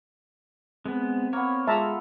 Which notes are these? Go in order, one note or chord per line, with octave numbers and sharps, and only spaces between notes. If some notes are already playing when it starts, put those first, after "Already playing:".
G#3 B3 C4
A#3 B3 C#5
G#3 F4 A4 E5 A5 A#5